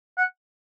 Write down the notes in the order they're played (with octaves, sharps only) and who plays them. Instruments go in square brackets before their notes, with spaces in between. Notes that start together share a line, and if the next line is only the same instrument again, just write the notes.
[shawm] F#5